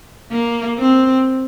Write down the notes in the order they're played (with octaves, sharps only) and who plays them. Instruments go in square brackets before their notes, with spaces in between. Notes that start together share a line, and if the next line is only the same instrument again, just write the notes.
[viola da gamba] A#3
C4